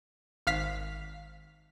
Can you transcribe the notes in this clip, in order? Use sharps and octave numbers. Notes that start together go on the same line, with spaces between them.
G#1 F5 F6 B6